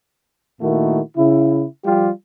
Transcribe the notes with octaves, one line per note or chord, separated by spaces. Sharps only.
A#2 D#3 A3 A#3 E4 F#4
C#3 E4
F3 G3 F4 G4